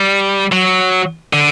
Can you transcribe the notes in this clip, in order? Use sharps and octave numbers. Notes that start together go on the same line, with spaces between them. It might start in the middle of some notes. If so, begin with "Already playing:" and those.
Already playing: G3
F#3
D3